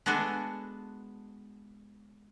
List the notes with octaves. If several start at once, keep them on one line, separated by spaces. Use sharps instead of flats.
G#3 B3 D4 F#4 A4 G#5